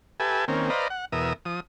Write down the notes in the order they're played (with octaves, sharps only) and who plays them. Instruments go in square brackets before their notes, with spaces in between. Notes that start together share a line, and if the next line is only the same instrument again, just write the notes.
[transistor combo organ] G4 A4 B4 E5 G#5
D#3 A#3 C4 C#4
B4 C5 D5 D#5 F5 A#5
F#5
E2 B2 A#4 E5 D#6
F3 D#6